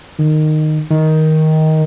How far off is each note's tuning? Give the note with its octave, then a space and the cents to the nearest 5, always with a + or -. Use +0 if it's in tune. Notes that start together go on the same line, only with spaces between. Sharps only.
D#3 -15
D#3 +10